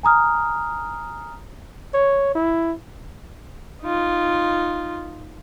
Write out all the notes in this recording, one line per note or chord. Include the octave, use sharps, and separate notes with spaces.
G#5 A#5 D#6 F6
C#5
E4
D#4 F4